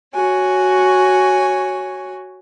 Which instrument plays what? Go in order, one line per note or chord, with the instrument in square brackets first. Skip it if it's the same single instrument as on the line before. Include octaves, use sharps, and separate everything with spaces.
[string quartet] F#4 C#5 G#5